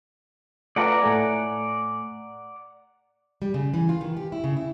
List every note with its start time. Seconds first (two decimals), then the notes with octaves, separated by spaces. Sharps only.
0.76 A3 F4 B4 D5 F#5 A#5
1.02 A2 A3 G#5
3.42 G3
3.54 C#3
3.74 E3
3.89 F4
4.01 D#3
4.17 G4
4.32 E4
4.44 C#3
4.57 E4